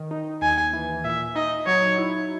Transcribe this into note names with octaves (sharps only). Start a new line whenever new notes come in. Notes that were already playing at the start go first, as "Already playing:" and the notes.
Already playing: D#3
D#4
D#2 G#5
E3
A#2 E5
D#4 D#5
F#3 C#5
E4